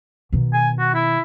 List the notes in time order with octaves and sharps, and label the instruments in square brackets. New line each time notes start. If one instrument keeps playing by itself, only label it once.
[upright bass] B2 D#3
[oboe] G#5
F#4
E4